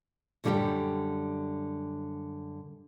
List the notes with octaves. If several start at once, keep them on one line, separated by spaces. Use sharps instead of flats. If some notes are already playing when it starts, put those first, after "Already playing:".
F#2 D3 G3 F#4 G4 G5